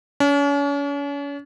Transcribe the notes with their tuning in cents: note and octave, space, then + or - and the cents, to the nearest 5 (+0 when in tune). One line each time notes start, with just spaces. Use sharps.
C#4 +40